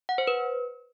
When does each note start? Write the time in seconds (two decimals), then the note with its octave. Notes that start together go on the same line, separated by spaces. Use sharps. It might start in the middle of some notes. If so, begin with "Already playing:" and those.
0.09 F#5
0.18 C5
0.27 B4